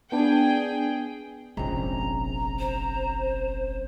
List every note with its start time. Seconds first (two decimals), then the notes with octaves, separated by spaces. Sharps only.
0.12 B3 D4 G#4 G5
1.57 F1 A#1 G#3 C4 C#4 A#5
2.59 C5